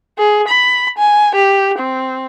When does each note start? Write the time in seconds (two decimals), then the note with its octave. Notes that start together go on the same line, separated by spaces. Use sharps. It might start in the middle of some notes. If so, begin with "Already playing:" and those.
0.18 G#4
0.48 B5
0.98 G#5
1.35 G4
1.78 C4